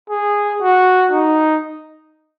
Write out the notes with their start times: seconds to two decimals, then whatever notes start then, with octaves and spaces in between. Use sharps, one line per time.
0.10 G#4
0.61 F#4
1.11 D#4